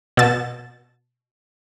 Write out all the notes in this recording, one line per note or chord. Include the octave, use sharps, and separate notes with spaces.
B2 A5